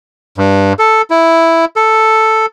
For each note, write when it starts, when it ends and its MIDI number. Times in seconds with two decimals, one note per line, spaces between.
0.37 0.73 43
0.79 1.02 69
1.10 1.65 64
1.76 2.46 69